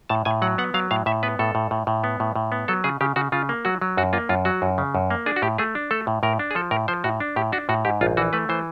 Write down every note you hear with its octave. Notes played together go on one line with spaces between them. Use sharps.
A2 A5
A2 G#5
F#3 F#5
B3 F#5
F#3 F5
A2 F5
A2 E5
B3 B4
A2 A4
A2
A2
A2
B3
A2
A2
B3
F#3 A4
C#3 G#4
C#3 G4
C#3 F#4
C#3 F4
A#3
F#3 F#4
F#3
F#2 F#4
A#3 F4
F#2 F4
F#3 F#4
F#2
C#3
F#2
A#3
D4 G#4
F#4
A2 G4
A3 G#4
D4
A3 A4
A2
A2 A#4
D4
G#4
F3 A4
A2 A#4
F3 C5
A2 F#4
D4
A2 G4
D4 F#4
A2 F#4
G#2 G4
A#1 F4
E3 F#4
A3 B4
E3 C5